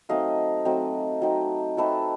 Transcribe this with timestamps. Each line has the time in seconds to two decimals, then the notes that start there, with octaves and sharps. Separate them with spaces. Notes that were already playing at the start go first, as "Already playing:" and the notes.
0.09 F#3 A3 C4 D#4 D#5 F5
0.65 F#3 A3 C4 D#4
1.22 F#3 A3 C4 D#4
1.77 F#3 A3 C4 D#4 A4 B4